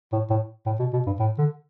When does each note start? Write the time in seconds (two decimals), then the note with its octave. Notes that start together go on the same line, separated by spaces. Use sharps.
0.13 A2
0.30 A2
0.66 A2
0.79 B2
0.93 B2
1.07 G2
1.20 A2
1.38 D3